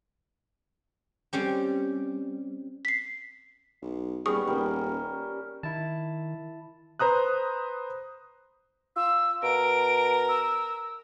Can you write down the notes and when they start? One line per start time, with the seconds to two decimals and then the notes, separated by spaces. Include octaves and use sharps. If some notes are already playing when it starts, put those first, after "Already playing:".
1.33 G3 C4 C#4 G4
2.85 B6 C7
3.82 B1
4.26 D#1 G3 B3 C#4 G#4 C#6 D#6
4.47 D#1 G3 A#4
5.63 D#3 E4 A5
6.99 B4 C5 A#5 D#6 F#6
8.96 F4 E6
9.43 B2 A#4 D7
10.29 E6